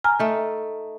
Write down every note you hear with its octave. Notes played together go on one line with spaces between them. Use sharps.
G#5 A#5 F6
A3 D#4